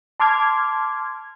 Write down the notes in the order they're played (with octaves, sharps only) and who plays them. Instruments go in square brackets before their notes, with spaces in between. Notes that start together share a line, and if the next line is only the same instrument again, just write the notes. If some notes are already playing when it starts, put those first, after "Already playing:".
[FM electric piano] A5 C6 D6 F6 G#6